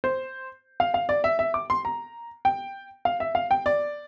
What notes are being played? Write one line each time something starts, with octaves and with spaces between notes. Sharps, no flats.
C5
F5
F5
D5
E5
E5
D6
C6
A#5
G5
F5
E5
F5
G5
D5